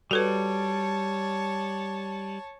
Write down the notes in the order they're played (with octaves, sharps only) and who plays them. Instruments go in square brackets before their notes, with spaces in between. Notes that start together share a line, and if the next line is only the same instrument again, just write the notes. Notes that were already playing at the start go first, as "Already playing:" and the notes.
[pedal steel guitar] G3 [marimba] F#4 A4 B4 [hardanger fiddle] C#5 A5